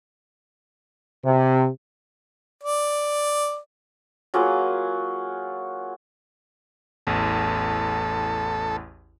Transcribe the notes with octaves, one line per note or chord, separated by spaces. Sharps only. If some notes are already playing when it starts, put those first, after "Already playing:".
C3
D5
F#3 A#3 F4 G#4
A1 E2 A4